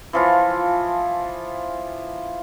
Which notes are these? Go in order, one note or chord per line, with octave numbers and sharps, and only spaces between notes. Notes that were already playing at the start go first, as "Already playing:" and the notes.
E3 F3 F4